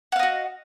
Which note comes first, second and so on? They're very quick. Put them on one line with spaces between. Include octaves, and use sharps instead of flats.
F#5 F5 D#5 F#4